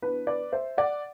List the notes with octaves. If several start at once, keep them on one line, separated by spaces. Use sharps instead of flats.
E3 B3 D4 B4
B4 D5
C5 E5
D5 F#5